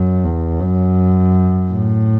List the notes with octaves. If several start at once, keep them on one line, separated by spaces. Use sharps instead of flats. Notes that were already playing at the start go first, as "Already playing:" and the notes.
Already playing: F#2
E2
F#2
A2